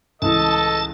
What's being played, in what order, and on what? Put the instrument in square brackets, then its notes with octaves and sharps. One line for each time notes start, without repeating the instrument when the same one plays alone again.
[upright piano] C#2 A2 E3 [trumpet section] A4 D#5 [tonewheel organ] A5